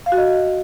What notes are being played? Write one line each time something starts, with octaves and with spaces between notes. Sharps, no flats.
F5
F#4
D#5